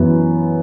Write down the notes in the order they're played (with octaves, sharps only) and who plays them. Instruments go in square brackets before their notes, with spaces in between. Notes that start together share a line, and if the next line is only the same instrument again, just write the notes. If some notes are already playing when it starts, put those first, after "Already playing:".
Already playing: [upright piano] F#2 E3 B3